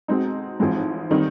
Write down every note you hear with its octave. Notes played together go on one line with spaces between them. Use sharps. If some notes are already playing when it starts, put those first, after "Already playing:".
B2 G#3 C4 D#4
A1 G#2 F3 G#3 C4
D#3 G3 C4 D#4